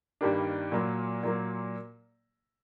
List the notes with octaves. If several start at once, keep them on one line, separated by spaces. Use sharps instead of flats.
G2 D#3 G3 A#3 D4
A#2 F#3 A#3
A#2 F#3 A#3